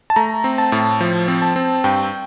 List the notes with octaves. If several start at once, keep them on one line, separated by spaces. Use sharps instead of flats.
A5
A3 A#5
C4
A5
A2
F3
C4
A5
C4
G2 G5